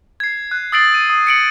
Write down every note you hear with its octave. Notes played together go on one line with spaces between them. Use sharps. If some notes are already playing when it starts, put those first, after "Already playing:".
G#6 C7
F#6
D#6 E6 A6 C7 D7 F#7
D#7
D#6
C#7 D7 F#7